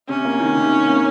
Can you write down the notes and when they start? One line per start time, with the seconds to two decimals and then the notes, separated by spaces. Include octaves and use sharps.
0.09 C3 C#4
0.25 A#3
0.40 D#3
0.56 C3
0.72 C3
0.88 A#3